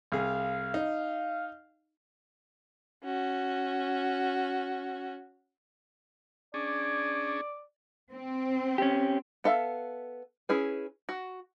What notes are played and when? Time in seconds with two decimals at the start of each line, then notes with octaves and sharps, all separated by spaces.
0.12 C2 G#4 F5
0.74 D#4
3.04 C#4 F#4
6.54 C#4 D4 G#4 D5
8.12 C4
8.78 C#4 G4
9.44 B3 A4 E5 F5
10.49 C#4 E4 G#4 B4
11.09 F#4